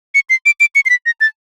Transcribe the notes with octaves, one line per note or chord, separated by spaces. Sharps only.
C#7
C7
D7
D7
C#7
C7
B6
A#6
A6